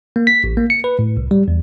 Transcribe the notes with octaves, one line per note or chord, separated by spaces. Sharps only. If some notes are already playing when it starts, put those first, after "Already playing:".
A#3
B6
A1
A#3
C#7
B4
A2
C2
G3
E2